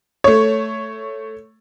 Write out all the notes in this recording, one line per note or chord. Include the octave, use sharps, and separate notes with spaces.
A3 C#5